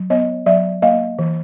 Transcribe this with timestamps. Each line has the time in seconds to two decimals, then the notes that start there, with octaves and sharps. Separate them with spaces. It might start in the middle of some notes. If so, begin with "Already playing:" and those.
Already playing: F#3
0.10 B3 C#5 D#5
0.46 F#3 D5 E5
0.82 A#3 D#5 F5
1.19 E3